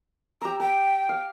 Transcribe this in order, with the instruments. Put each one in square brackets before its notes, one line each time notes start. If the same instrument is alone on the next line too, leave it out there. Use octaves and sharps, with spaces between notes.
[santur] G4 E6 [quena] A#5
[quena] G5 [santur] A#5
[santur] F5